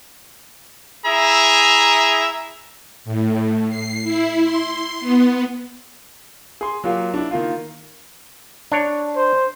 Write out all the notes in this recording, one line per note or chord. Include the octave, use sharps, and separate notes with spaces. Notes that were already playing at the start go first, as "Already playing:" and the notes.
E4 G#4 E5 A#5
A2
C7
E4
C6
B3
G#4 C6
F#3 A#3 F4 G4
D4 E4
D#3 A#3 F4
D4 C#5
C5